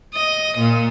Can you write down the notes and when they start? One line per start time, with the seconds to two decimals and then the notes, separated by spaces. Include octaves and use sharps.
0.14 D#5
0.58 A#2